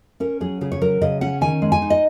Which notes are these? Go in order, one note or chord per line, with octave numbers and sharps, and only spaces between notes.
C#4 A#4
F#3 G#4
C#3 G#4
C#5
F#3 A#4
C#3 D#5
C#4 F#5
D#3 G#5
G#3
G#5
D#4
D#5